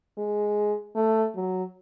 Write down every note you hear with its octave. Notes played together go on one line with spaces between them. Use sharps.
G#3
A3
F#3